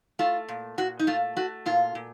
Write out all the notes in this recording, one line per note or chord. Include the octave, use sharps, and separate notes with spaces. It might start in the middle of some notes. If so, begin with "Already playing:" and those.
A3 F4
A#2
A#2 F#4
D#4
A3 F4
A3 F#4
A#2 F4
A#2